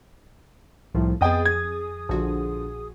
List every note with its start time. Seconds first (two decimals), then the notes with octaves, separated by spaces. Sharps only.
0.94 C2 A2 F3
1.21 F2 B3 G#4 D#5 G5 D#6 A6
1.46 G#6
2.09 A#1 D3 F3 F#4